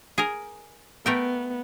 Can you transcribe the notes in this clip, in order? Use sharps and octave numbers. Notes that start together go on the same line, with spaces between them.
G#4 A#4
A3 B3 A#4 G5